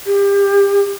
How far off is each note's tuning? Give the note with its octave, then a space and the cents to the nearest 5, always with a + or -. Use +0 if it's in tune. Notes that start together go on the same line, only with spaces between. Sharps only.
G4 +30